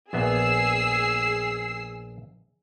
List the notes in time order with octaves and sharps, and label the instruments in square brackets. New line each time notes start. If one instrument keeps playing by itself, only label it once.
[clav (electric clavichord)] A#1 B3 E5 [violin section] G#4 E6 C7